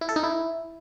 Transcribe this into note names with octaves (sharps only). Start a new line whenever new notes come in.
E4
A4
D#4
E4